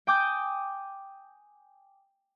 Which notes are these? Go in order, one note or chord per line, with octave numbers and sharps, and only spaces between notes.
G5 G#5 D6 D#6 G6